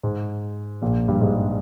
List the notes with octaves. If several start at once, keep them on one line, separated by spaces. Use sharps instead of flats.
G#2
A#1 A#2
G2 G3
G#2 G#3